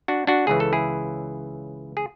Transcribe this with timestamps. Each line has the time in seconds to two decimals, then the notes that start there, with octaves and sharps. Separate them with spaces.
0.08 D4 F#4
0.27 D4 F#4
0.47 C#2 C#3 E3 G#4
0.60 A4
0.73 E4 G#4
1.97 G#4